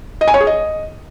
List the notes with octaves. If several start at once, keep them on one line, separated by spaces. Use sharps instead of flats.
D#5
G#5
C#5
G#4
D#5